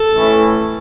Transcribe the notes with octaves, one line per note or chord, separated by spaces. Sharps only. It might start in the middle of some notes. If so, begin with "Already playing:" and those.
Already playing: A4
A2 E3 A3 C#4 E4